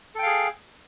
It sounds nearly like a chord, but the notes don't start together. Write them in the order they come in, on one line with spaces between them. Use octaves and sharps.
A4 G5 F5 G#4